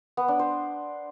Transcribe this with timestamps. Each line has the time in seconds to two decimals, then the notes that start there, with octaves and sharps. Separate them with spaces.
0.17 B3
0.28 D4
0.39 C5